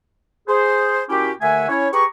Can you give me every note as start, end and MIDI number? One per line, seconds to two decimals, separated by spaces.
0.48 1.03 68
0.48 1.03 72
1.09 1.31 46
1.09 1.31 61
1.09 1.31 64
1.09 1.31 66
1.09 1.31 67
1.41 1.69 39
1.41 1.69 50
1.41 1.69 57
1.41 1.69 76
1.41 1.69 78
1.41 1.69 80
1.69 1.87 61
1.69 1.87 64
1.69 1.87 73
1.93 2.04 67
1.93 2.04 68
1.93 2.04 71
1.93 2.04 82
1.93 2.04 85